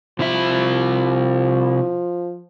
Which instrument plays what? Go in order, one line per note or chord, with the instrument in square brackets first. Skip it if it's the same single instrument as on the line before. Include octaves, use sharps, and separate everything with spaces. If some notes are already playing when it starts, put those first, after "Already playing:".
[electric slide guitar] C3 E4 E5 [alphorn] F3